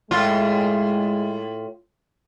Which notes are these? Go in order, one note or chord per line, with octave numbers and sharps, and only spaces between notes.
A2 G#3 F4